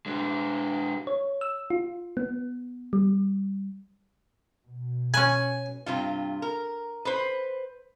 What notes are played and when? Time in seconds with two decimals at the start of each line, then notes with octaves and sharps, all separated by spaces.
0.06 G#3 D4
1.07 C#5
1.41 E6
1.70 F4
2.17 B3
2.93 G3
4.67 B2
5.14 C#4 B4 G#5
5.86 G2 C3 F4
6.42 A#4
7.05 B4 C5